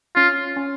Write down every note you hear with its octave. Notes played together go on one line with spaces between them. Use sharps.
C#4 F4
C#4